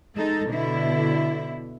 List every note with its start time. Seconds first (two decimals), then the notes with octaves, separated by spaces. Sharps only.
0.15 G#3 D#4 A4
0.49 B2 D3 E4